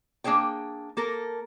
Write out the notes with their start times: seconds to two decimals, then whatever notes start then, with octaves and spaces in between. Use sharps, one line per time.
0.24 A#3 D4 G#4 C#5 G5
0.97 A#3 A4 A#4